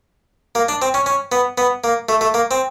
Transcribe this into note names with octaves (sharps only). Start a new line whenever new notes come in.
A#3
D4
C4
C#4
C#4
B3
B3
A#3
A3
A3
A#3
C4